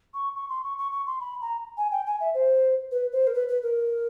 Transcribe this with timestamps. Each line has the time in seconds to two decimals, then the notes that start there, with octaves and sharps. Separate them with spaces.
0.14 C#6
0.36 C#6
0.49 C6
0.64 C#6
0.78 C#6
0.92 C#6
1.07 C6
1.20 B5
1.42 A#5
1.77 G#5
1.92 G5
2.06 G#5
2.20 E5
2.34 C5
2.91 B4
3.12 C5
3.27 A#4
3.34 B4
3.48 B4
3.63 A#4